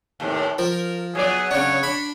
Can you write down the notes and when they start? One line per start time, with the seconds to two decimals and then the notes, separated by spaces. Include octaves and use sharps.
0.20 D#2 A2 C3
0.58 F3 A#4
1.15 F#3 B3 G#4 D5
1.51 C#3 D4 C#5
1.83 D4 B5